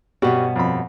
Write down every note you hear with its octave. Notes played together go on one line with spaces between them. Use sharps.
G2 B2 G3 C#4 F#4
F2 B5